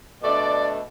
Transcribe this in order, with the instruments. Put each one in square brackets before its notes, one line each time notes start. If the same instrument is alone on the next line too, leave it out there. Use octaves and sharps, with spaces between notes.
[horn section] B2 A3 D4 D5